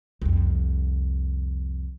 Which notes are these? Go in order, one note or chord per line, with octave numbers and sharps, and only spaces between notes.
C2 F2